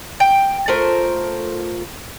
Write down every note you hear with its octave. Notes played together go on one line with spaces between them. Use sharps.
G5
A3 F4 A#4 C5